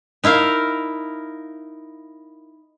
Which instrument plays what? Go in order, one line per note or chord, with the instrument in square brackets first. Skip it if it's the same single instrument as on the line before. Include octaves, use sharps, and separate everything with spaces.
[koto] D#4 E4 A#4 F5